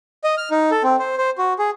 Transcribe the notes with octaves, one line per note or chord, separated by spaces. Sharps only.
D#5
F6
D#4
A4
C4
C5
C5
F#4
G#4